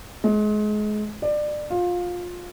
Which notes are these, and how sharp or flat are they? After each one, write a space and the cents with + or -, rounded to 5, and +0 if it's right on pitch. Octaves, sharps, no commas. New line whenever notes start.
G#3 +30
D5 +25
F4 +20